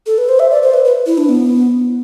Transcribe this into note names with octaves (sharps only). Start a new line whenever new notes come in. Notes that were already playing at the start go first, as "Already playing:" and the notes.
A4
B4
C5
E5
D5
C5
B4
B4
E4
D4
B3